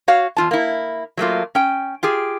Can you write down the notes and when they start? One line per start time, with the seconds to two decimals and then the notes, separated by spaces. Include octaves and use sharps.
0.08 F#4 C#5 F5
0.37 E2 F4 A5
0.51 A#3 E4
1.17 F#3 A3 A#3 F4
1.55 C#4 G5
2.03 F4 G4 G#4